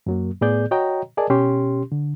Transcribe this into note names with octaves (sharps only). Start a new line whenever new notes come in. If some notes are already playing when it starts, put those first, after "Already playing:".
F#2 F#3 A#3
A2 B3 G#4 D5 G6
F#4 C#5 D#5 G5 A#5
G#4 A#4 D5 D#5 G#5 A5
B2 C#4 G4 C6
D3